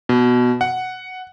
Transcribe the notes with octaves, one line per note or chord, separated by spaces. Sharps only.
B2
F#5